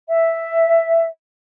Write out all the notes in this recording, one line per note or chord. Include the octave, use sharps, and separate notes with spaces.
E5